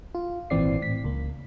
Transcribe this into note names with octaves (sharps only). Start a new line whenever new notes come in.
F4
G#1 A#2 E3 C4 D5 C7
A2 B6
C#2 A#3